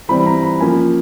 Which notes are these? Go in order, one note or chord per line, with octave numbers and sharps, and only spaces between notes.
E3 G3 C4 B5
A#5
B5
F3 A#3 C#4 G#5